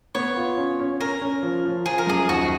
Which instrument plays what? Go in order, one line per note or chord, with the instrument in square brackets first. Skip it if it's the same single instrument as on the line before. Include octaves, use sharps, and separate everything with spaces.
[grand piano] B3 [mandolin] C#5
[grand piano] F4
C#4
C#4
[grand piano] C#4 [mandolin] A#4
[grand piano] C#4
F3
F3
[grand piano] F3 [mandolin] G#4
[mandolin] A#4
[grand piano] F#2 [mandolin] G#4
[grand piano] D#2 [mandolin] F#4